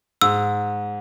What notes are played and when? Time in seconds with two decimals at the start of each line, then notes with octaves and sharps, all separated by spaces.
0.21 G#2 E6